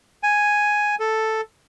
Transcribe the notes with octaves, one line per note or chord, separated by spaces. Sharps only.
G#5
A4